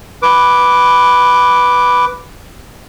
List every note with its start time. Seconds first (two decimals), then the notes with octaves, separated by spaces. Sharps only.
0.22 B4 D6